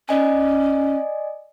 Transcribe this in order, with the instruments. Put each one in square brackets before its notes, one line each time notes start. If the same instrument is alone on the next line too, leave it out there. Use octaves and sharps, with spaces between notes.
[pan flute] C#4 [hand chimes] D5 D#5 G#5